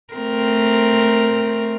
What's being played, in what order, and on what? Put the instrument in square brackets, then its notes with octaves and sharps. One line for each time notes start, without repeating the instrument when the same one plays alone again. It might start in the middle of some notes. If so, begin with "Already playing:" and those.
[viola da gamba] A3 C4 A#4